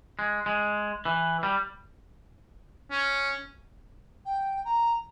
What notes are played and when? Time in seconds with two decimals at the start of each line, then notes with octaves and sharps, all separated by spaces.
0.19 G#3
0.46 G#3
1.05 E3
1.43 G3
2.91 C#4
4.25 G5
4.65 A#5